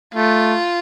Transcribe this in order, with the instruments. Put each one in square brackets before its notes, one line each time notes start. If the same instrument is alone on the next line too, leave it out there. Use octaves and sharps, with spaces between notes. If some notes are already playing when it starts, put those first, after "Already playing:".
[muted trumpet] A3 [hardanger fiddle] F4